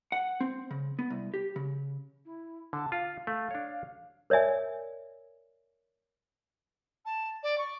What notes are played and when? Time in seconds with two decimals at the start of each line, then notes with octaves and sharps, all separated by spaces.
0.12 F#5
0.41 C4
0.71 C#3
0.99 B3
1.10 C2
1.34 G4
1.56 C#3
2.25 E4
2.73 D3 A5
2.92 F4 F5
3.27 A3 F5
3.51 D4 C#5
4.30 A#4 C#5 D5 E5 G#5
7.06 A5
7.43 D5
7.58 C#6